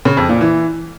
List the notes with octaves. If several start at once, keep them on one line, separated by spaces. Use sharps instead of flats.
C#3
F2
A#2
E3